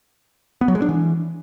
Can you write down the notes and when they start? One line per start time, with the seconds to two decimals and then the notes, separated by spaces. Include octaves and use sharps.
0.61 B3
0.68 F#3
0.75 G#3
0.82 D4
0.89 E3